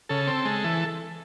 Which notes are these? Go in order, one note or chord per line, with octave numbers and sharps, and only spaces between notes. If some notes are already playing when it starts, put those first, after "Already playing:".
C#3 A4
C4
G#3
E3